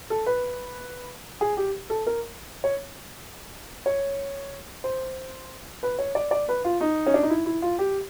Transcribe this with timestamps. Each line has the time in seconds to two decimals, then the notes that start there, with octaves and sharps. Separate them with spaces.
0.10 A4
0.26 B4
1.41 G#4
1.57 G4
1.90 A4
2.07 A#4
2.64 C#5
3.86 C#5
4.84 C5
5.83 B4
5.99 C#5
6.15 D5
6.31 D5
6.49 B4
6.65 F4
6.81 D#4
7.07 C#4
7.14 D4
7.23 D#4
7.30 E4
7.46 E4
7.62 F4
7.79 G4